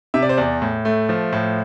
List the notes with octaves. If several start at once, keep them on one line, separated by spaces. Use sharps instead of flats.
C3 E5
D5
C5
E2 D5
A2
A3
F3
A2